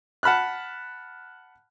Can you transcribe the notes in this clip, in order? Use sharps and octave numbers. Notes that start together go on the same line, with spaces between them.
F#5 A5 B5 F6 F#6